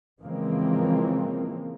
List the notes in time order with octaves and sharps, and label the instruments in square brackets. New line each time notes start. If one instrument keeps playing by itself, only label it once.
[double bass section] C#3 E3 F3 G#3 A#3 C4